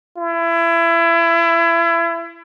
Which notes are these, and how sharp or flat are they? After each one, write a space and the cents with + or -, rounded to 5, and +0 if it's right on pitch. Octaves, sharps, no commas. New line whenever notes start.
E4 +30